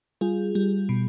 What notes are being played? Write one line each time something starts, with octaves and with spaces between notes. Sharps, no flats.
G3 F4 G#4
G3
B2